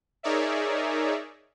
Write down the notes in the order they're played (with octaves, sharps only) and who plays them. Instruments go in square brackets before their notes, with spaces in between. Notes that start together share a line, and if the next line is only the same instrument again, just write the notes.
[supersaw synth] D#4 G#4 A#4 C#5 D5 E5